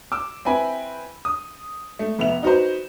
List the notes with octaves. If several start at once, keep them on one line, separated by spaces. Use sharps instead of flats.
D6 E6
C4 E4 B4 G5 G#5 B5
D#6
A3
F1 B3 E5 F7
D#4 F#4 B4 C5